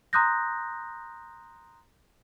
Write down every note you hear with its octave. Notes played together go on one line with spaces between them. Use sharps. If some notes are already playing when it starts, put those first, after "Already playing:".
A#5 C6 D#6 F#6 G6 A#6